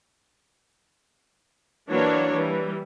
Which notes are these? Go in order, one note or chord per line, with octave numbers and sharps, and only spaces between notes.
E3 F#3 A#3 D4 C#5
E3 G3